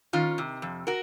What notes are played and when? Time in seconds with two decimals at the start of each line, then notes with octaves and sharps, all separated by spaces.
0.13 D#3 C#4 F4
0.38 C3
0.62 F2
0.87 F#4 A#4